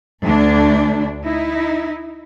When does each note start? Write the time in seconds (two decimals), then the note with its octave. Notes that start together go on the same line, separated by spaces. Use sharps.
0.23 D2 D4
1.23 D#4 E4